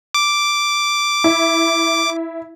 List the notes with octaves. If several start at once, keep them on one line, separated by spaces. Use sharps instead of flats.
D6
E4